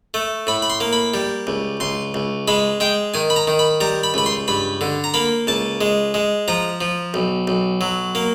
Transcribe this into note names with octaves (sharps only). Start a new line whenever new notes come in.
A3
A2 B5
B5
C6
A#3
B5
G3
C#2
C#2 C6
C#2
G#3 B5
G#3 G5
D#3 G#5
B5
A#5
D#3
B5
G3 A#5
B5
C#2 B5
C6
G2 B5
D3
A#5
A#3 B5
C#2 A5
G#3
G#3
F3 A#5
F3
B1
B1
F#3
A#3